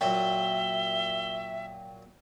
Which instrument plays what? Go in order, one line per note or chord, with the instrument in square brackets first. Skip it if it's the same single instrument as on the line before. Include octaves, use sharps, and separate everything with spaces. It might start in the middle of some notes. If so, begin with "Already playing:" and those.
[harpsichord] A#2 F#3 [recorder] E5 [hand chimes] G5 [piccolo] G7